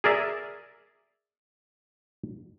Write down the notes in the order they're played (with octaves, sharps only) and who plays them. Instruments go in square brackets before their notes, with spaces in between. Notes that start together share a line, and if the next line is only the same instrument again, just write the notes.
[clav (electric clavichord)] G#4 A#4 D5 E5